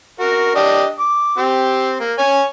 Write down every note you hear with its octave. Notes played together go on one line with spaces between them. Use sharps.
F#4 A#4
D4 G4 D#5
D6
C4 G4
A#3
C#5 G#5